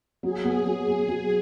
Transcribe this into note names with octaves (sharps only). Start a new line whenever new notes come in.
F#3 G#4
B3
F#3
B3
F#3